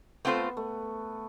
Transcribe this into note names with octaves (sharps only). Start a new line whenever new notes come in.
A3 B3 C4 F4 A4 C5
A3